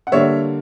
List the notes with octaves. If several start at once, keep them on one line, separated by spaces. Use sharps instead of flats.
F#5
D3 G3 A#3 C#5 E5